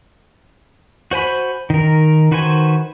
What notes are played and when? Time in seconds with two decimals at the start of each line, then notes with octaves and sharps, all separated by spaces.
1.11 F#4 C5 G#5 B5
1.70 D#3 A#4
2.31 D#3 F#4 B4 C5 G#5